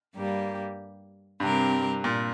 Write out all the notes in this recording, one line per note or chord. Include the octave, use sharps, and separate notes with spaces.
G2 G3 A#3 G4
G2 C3 G3 C4 G4 A#4
A#2